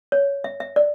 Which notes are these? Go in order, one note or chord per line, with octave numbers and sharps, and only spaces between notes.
C#5
E5
E5
D5